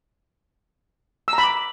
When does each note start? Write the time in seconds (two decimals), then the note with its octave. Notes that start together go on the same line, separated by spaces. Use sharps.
1.28 E6
1.33 A#5
1.38 B5
1.43 D6